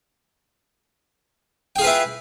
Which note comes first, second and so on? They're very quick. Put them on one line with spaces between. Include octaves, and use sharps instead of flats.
G5 G#4 F4 B4 E4